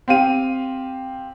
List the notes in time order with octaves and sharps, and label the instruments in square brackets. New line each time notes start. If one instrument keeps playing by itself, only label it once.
[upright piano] C4 G4 F5 D#7